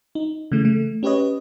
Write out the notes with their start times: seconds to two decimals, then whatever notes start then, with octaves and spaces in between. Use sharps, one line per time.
0.15 D#4
0.52 C#3 E3 A3
0.65 A3
1.03 C#4 G4 B4 C#5 D#5